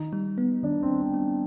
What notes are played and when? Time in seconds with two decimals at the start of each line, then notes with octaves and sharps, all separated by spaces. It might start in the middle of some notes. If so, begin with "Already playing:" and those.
Already playing: D#3 D#4
0.13 G3
0.38 B3
0.63 D#3 D4
0.83 C4
0.88 D#3
1.02 C4
1.14 G3